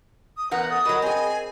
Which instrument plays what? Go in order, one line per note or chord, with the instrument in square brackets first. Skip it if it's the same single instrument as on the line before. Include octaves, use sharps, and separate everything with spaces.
[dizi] D#6
[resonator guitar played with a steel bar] E2 A#4 F#5 [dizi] B4
[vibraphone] A4 [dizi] D#6
[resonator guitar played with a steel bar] F#3 F#4 [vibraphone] A#4 D#5 B5
[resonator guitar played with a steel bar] C4 G#4 [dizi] G#5